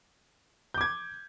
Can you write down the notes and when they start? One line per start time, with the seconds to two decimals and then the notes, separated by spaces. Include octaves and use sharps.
0.74 G6
0.78 D6
0.81 G#6